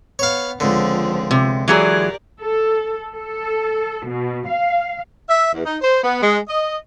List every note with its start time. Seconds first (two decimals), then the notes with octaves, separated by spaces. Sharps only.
0.19 B3 C#5 F5
0.60 C#2 D3 F3 C4
1.31 C3
1.68 E3 F#3 G4 G#4 A#4 D5
2.40 A4
3.16 A4
4.07 B2
4.48 F5
5.29 E5
5.53 E2
5.65 D#4
5.81 C5
6.03 B3
6.22 G#3
6.48 D#5